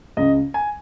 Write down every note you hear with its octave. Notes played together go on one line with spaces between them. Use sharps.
C#2 C#3 D#5
G#5